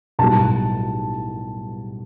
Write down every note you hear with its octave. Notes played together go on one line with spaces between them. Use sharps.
B1 A2 G3 A5